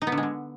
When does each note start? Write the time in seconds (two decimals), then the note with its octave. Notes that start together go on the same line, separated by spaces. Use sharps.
0.02 D#4
0.07 B3
0.12 D3
0.18 G#3
0.23 D3